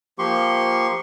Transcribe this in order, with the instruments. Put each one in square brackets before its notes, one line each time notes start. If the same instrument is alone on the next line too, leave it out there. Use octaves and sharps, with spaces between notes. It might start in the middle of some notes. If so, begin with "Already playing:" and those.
[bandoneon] F3 A#3 G4 C6 C#6